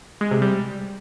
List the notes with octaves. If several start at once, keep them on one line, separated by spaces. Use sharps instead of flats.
G#3
C3
G3